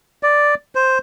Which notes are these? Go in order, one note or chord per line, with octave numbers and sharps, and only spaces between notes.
D5
C5